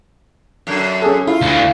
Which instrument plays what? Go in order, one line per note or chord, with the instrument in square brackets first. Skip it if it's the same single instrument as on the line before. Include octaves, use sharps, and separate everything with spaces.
[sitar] F#2 D3
[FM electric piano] C#4 G#4 A4
[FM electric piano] E4 [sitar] F4
[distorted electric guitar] D2